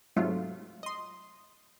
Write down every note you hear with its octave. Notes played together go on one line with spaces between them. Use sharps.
G#2 C3 F#3 A3 F4
D#5 C6